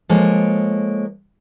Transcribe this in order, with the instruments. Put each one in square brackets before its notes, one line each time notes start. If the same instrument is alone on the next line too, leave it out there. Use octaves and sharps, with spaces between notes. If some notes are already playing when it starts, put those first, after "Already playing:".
[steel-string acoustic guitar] F3 G#3 A#3 A4 C#5